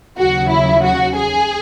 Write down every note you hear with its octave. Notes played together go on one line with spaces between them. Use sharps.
D#2 C#3 F#3 F#4
E4
F#4
G#4